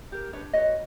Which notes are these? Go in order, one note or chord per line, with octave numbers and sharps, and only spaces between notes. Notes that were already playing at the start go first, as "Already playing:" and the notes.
G4 A#4
D4 B4 C#5
F#4 B4 C#5 D#5